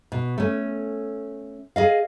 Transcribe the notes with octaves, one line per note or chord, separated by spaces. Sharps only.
B2
A3 C#4
G#4 D#5 F5